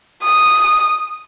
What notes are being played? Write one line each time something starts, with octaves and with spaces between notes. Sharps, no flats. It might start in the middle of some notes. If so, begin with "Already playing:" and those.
D#6